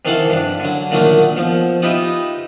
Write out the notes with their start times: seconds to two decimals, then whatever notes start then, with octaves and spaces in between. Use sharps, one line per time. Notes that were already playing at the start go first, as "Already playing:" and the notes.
0.05 C3 D#3 E3 A4 F5 F#5
0.30 G2 D4
0.60 D3 F#3
0.91 A#2 D3 D#3 F#3 A3 A#3
1.37 B2 F3
1.82 D#4 F4 G4 B4 D#5 E5